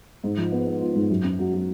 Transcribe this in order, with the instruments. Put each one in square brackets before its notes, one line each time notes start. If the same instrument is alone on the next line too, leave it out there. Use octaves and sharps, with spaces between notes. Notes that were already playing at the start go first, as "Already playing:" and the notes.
[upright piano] G#2
F3
B3
B3
F4
G#2
F#2
C#4
F#3
F#3